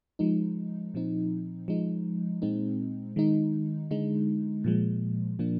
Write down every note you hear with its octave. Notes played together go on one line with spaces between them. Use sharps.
F3 G#3 D#4
A#2 F3 C4 D#4
F3 G#3 D#4
A#2 G#3 C4 D#4
D#3 G#3 D#4
D3 G#3 D#4
A#2 F3 G#3
A#2 F3 A#3 D4